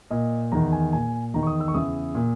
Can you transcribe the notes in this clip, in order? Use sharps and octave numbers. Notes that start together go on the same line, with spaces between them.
A#2 D#5
E2 D#3 A#5
G#5
A#2 G#5
E2 D#3 A#5
C#6
D#6
E6
C#6
E2 C#3 E3 D#6
A#2